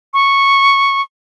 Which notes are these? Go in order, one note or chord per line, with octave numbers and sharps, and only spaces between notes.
C#6